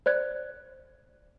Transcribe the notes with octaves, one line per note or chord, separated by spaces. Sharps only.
C5 D5 F#6 G#6